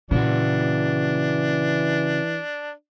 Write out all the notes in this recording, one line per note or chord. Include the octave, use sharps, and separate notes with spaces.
A#2 C#3 E3 D4 F#4